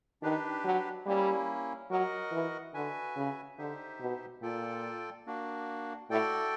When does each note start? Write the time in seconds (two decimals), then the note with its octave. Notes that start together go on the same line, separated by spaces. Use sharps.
0.22 D#3 D4 G4 B4
0.64 F#3
1.06 G3 A#3 C#4 E4
1.90 F#3 F#4 A#4 D#5 F#5
2.32 E3
2.74 D3 F#4 B4 E5 G#5
3.16 C#3
3.58 D3 D#4 G4 C5 E5
4.00 B2
4.42 A#2 F4 A4 D5 G5
5.26 A#3 D4 F#4
6.10 A2 F#4 A4 D5 G5